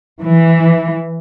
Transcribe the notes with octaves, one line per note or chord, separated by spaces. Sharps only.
E3